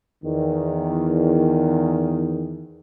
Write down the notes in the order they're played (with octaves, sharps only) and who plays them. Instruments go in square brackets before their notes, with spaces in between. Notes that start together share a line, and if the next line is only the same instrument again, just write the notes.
[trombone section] E2 D#3